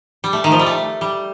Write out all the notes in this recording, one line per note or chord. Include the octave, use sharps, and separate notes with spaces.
G3
A3
D#3
F3
G3
A3
G3